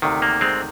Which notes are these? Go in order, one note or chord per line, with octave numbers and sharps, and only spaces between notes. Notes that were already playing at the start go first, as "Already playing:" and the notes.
D2 C3 D#3
A#3
G#3 C4